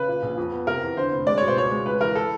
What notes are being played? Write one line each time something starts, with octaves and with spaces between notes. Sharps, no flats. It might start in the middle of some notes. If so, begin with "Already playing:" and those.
Already playing: C#3 B4
A#2
A#1
F2
B3
C3 A#4
E2
D3 C5
F1
G#3 D5
B2 C#5
C5
C#2 C#5
G#3
C#2 B4
E3 A#4
A4